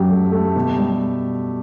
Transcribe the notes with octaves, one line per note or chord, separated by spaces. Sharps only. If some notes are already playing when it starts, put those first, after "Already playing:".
Already playing: F#2 F#3 G4
A3
A3
B2
G3